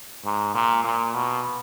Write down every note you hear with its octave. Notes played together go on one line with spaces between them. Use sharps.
G#2
A#2
A#2
B2